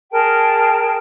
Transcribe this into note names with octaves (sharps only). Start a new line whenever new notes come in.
G#4 A#4 G5 A5